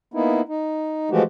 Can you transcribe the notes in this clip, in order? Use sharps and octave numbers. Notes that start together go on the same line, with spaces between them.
A#3 B3 D#4 E4
D#4
E3 F3 G#3 A3 F#4 G4